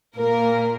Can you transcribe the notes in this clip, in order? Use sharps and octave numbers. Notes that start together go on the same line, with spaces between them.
A#2 A#3 A#4